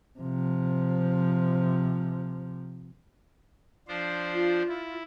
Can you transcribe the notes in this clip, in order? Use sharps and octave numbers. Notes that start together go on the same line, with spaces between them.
C3 F3
F3 D4 C5
F4
E4